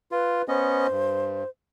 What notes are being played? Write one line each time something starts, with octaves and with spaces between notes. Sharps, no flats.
F4 B4
B3 C#4 C5 D#5
G2